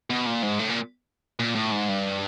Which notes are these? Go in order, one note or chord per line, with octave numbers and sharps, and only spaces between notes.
B2
A#2
G#2
A2
A#2
A#2
A2
G#2
G2